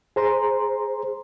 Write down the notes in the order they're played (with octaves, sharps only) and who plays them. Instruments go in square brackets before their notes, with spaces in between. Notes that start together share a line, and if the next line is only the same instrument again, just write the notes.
[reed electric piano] G#4 C5 A#5 C6